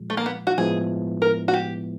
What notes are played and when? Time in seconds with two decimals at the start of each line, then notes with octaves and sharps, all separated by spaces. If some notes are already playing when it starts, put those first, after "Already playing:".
Already playing: A#2 F3 G#3
0.10 A3
0.17 A#3
0.26 B3
0.47 F#4
0.58 A2 F3 G#3 B3 E4 G#4
1.22 A#4
1.48 F#4
1.54 G4